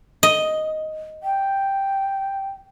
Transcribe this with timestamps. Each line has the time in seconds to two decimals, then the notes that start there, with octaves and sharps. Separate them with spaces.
0.23 D#5
1.23 G5